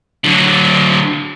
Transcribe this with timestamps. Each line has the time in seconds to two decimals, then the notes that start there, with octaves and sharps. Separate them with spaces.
0.24 D3 F#3